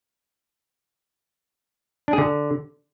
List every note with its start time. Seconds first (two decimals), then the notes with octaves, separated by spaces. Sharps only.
2.08 D4
2.13 G#4
2.18 D3